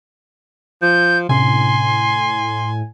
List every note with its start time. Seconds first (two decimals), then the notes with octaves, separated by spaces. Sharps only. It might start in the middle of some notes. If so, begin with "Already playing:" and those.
0.82 F3 G6
1.29 A2 C3 C#4 D4 G#5 C6